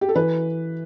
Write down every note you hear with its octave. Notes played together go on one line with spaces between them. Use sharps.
G4
A4
E3 B4